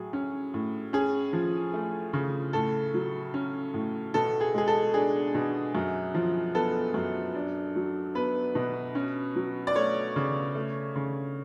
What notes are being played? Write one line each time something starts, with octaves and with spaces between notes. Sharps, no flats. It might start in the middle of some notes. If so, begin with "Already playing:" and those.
Already playing: A2 F#3 G#4
C#4
A2
C#4 G#4
F3
A3
C#3
A2 A4
F#3
C#4
A2
B2 A4
G#4
G#3 G#4
A4
D4 G#4
B2
F#2
F3
B3 A4
F#2
D4
F#3
B3 B4
B2
C#4
F#3
D5
A3 C#5
C#3
A3
C#3